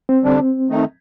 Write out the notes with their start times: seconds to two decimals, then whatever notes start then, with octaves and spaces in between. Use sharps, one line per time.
0.09 C4
0.23 D3 G3 D4
0.69 D#3 A3 D#4